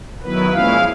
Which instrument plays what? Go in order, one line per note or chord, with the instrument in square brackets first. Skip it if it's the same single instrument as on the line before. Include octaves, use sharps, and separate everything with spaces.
[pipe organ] D#3 F#3 B3 E4 B4
A#2 F3 G#3 C#4 E4 F5